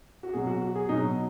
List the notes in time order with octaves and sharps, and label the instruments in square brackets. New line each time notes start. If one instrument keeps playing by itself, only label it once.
[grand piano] F#4
B2 F#3 G#4
F#4
F#4
G#4
B2 F#3 D#4